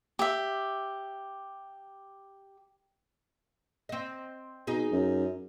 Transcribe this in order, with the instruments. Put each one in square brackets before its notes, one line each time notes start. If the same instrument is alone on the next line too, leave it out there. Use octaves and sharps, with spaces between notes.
[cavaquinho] G4 E5
[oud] C4 D#5
[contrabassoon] B2 [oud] D#4 G#4
[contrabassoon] F#2